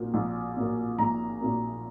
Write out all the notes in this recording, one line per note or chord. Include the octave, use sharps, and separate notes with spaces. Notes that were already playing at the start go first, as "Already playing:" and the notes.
Already playing: A#1 A#2 F#3 A#3
A#1
A#2 F#3 A#3
A#1 A#5
A#2 F#3 A#3